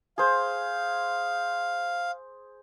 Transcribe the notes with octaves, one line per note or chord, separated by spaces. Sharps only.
G#4 C5 F5